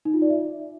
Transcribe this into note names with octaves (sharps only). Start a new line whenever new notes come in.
D#4
F4
D5
E5